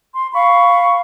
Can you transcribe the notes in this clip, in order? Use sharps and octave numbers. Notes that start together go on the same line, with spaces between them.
C6
F5 B5 C#6